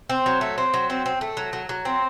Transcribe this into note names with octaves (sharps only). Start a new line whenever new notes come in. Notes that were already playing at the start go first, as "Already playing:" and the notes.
C4
F#3
A3
C4
F#3
C4
C4
A3
F#3
F#3
F#3
C4